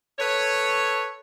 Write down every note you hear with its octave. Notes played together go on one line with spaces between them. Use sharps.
A4 B4 C#5